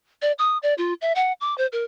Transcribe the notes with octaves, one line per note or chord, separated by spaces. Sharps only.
D5
D#6
D5
F4
E5
F#5
D6
C5
A#4